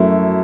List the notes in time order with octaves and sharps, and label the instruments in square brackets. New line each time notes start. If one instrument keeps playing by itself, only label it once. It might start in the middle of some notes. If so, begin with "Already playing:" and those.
Already playing: [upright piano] F#2 F#3 A3 E4